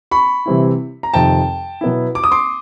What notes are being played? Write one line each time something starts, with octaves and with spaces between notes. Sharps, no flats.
B5 C#6
C3 E3 G3 C4 E4
A#5
F2 C3 D#3 G5 A5
B2 F#3 B3 E4
D6
D#6
C6 D6